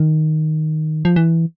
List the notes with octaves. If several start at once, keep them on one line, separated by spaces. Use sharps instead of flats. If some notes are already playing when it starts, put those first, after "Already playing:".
Already playing: D#3
F3
E3